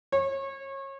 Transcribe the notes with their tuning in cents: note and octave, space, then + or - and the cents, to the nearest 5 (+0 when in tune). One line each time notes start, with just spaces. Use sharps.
C#5 -30